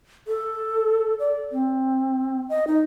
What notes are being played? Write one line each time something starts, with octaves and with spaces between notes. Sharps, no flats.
A4
D5
C4
D#5
D#4